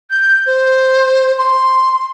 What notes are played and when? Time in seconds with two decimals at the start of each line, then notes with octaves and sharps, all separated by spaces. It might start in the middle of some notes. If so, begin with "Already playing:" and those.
0.11 G6
0.46 C5
1.38 C6